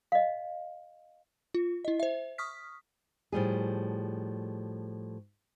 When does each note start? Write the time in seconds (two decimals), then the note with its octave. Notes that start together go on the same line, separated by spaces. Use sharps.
0.12 D#5 F5
1.54 F4
1.85 E4 D#5
2.00 C5 E5
2.38 C#6 D#6 F6 B6
3.32 A2 F3 G3 G#4